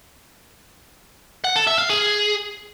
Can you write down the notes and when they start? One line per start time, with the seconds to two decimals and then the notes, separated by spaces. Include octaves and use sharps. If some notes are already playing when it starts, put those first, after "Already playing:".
1.44 F#5
1.56 A4
1.67 E5
1.78 F5
1.90 G#4